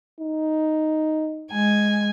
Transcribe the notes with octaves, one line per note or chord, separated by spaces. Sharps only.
D#4
G#3 G#5